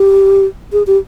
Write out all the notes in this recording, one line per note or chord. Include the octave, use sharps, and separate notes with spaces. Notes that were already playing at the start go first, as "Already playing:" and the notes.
Already playing: G4
G#4
G4